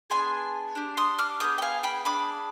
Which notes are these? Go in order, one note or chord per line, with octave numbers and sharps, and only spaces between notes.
B3 D4 G#4 G#5 C6
D4 G4
C6 D#6
D6 F6
B3 D#4 G#4 D#6 G6
G5
F5 G#5
G5 B5
D4 G#4 B5 D6